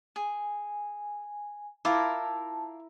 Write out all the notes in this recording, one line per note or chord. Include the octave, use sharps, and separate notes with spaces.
G#4 G#5
E4 F4 A#4 A5 D6